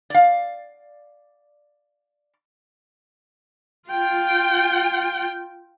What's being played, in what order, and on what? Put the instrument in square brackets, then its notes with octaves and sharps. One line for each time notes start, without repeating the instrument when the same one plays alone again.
[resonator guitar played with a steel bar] D5 F5
[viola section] F4 G5